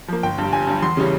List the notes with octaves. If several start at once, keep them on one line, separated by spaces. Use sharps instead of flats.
F3 A#3
G1 G5
G2 G3
G1 G#5
G2 G3
E2 C6
C#3 E3 G3 C#4